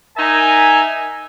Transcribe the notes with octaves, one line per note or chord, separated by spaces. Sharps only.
D#4 A#4 E5 G#5